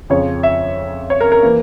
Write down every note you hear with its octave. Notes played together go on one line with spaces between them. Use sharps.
F2 C#3 F3 C#5
E5
C#5
A#4
A#4
E3 A#3